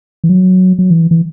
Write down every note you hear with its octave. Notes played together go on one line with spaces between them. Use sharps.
E3
F#3
F#3
E3
E3